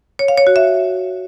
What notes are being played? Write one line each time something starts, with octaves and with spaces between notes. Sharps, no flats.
C#5
F5
C#5
F#4
E5